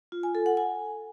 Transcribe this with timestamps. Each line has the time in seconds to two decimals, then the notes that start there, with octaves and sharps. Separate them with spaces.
0.12 F4
0.23 G#5
0.35 A4
0.46 F#5
0.57 G#5